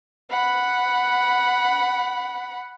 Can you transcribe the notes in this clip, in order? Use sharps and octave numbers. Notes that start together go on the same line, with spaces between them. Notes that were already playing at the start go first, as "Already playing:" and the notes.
F#5 B5